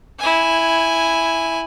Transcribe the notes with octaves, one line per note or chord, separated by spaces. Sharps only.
E4 G#5